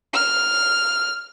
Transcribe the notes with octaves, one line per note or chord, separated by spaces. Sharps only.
F6